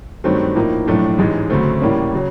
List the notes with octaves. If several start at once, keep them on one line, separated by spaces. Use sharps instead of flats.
G2 D#3 F#3 A3 C4
A2 F3 A#3 D#4
B1 A2 F3 A3 D4
A1 G#2 E3 G#3
D2 C#3 F#3 A3 C4
A2 E3 G3 A#3 C#4
C#3 F#3